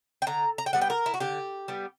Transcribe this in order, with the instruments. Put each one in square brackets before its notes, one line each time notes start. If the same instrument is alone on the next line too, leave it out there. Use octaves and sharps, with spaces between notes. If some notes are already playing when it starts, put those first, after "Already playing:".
[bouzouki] G5
D3 A#5
A#5
G5
G3 B3 F#5
G5
A#4
E4
F#4
D3 G4
G3 B3